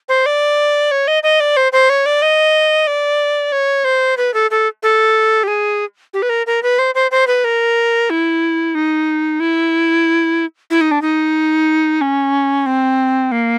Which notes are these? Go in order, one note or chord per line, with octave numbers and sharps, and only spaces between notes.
C5
D5
C#5
D#5
D#5
D5
C5
C5
C#5
D5
D#5
D5
C#5
C5
B4
A4
A4
A4
G4
G#4
G4
B4
A#4
A#4
B4
C5
C5
C5
B4
A#4
E4
D#4
E4
E4
D#4
D4
D#4
C#4
C4
A#3